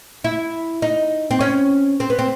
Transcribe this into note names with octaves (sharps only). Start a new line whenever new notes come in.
E4
D#4
C4
C#4
C4
B3
C4